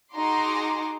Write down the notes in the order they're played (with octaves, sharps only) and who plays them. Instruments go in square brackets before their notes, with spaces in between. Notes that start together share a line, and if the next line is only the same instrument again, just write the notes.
[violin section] D#4 F#4 G#4 A#5 C6 D6